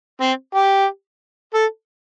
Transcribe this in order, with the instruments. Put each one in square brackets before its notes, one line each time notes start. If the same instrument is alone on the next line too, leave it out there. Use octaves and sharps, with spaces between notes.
[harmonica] C4
G4
A4